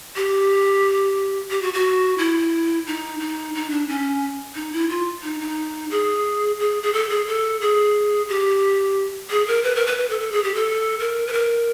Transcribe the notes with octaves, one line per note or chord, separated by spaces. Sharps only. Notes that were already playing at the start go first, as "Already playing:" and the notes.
G4
G4
F#4
F#4
E4
D#4
D#4
D#4
D4
C#4
D#4
E4
F4
D#4
D#4
G#4
G#4
G#4
A4
G#4
A4
G#4
G4
G#4
A#4
B4
A#4
B4
B4
A4
A4
G#4
G4
A4
A#4
B4
A#4